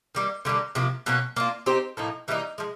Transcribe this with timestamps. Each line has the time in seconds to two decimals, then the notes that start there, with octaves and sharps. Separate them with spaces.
0.15 D#3 G3 A#3
0.45 D3 G3 A#3
0.75 C3 F3 A#3
1.06 B2 F#3 A#3 C#4
1.36 A#3 D4 F4
1.66 C4 D#4 G4 C5
1.97 A2 F3 A#3 D#4
2.28 E3 G3 A#3 D#4
2.58 F3 G#3